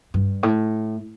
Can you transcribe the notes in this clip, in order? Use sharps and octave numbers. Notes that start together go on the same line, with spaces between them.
G2
A2